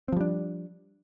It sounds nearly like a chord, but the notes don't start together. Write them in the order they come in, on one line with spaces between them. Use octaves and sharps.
C4 F3 G3 D4